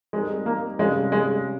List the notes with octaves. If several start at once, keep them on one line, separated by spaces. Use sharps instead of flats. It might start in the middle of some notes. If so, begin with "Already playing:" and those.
G3 G#3 C4 D#4 A#4
A#3
C3 G3 G#3 C#4 F4
G#3